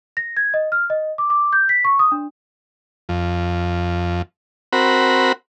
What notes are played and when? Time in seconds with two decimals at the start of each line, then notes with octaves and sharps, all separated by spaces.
0.17 A#6
0.37 G#6
0.54 D#5
0.72 F6
0.90 D#5
1.18 D6
1.30 D6
1.53 G6
1.69 B6
1.85 C#6
1.99 D#6
2.12 D4
3.09 F2
4.73 C4 F#4 A#4 B5